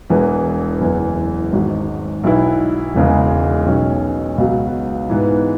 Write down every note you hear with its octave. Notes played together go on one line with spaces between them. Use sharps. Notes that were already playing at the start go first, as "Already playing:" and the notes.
E1 E2 E3
F#1 E2 E3
G#1 G#2 F#3
B1 B2 B3 E4
E1 E2 C#3 G#3
B1 B2 G#3 C#4
C#2 B2 F#3
G#2 E3 B3